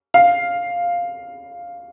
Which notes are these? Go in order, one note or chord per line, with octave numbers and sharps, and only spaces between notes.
F5